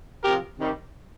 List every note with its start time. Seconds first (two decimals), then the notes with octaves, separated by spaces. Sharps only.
0.24 C3 F3 G4 A#4
0.58 C3 D#3 G3